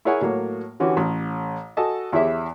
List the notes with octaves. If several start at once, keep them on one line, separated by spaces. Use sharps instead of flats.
E4 G#4 A#4 C#5 F#5 G#5
A2 F#3 A#3 C#5
D3 E3 C#4 F#4 G4
A1
F#4 A4 D#5 G#5 A5
E2 E4 G4 G#4 C#5 E5